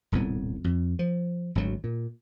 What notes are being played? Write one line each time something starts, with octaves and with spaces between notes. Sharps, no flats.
D#1 C2 A2 B3
F2
F3
G#1 D2 F#3
A#2